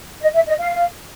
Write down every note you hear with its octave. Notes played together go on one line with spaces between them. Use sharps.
D#5
E5
D#5
F5